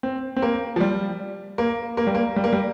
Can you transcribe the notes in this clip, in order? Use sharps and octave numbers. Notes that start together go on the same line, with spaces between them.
C4
C4
A#3
F3
G3
A#3
A#3
G3
A#3
G3
A#3
G3